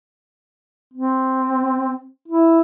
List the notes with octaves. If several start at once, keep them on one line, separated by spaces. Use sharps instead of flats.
C4
E4